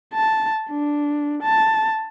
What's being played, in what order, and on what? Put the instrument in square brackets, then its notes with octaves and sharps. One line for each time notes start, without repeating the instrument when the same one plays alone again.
[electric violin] A5
D4
A5